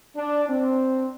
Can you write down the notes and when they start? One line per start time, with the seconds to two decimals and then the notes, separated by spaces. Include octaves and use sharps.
0.16 D4
0.49 C4